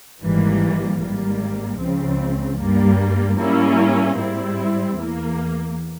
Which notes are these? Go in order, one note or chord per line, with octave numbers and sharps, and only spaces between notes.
G#1 G#2 E3 G3 A#3
G#1 G#2 G3 A#3
C#2 C#3 F3 C4
G2 G3 A#3
G#2 G3 A#3 C#4 E4
G#2 G3 C4 E4
E2 E3 A#3